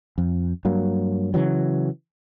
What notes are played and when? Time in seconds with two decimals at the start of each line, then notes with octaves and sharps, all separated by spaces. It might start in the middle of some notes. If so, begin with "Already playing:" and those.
0.18 F2
0.65 G2 F#3 A#3
1.34 C#3 E3 F#3